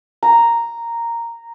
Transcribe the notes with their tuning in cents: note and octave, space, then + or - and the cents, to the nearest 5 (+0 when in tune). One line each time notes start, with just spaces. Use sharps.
A#5 -5